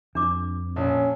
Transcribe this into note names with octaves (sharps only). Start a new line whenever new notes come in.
F2 D4 D6
A#1 C#4